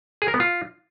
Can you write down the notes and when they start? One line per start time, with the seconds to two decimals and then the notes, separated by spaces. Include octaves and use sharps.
0.22 G#4
0.28 A#4
0.34 B3
0.40 F4